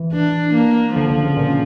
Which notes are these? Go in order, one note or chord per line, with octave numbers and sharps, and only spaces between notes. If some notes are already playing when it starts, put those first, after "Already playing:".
Already playing: E3
E3 D4
A#3
D3 F3
D3
C#3
A#2
C#3